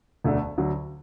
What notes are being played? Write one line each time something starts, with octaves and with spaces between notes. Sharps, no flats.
E1 D2 D3 A3 D4
D2 D3 F#3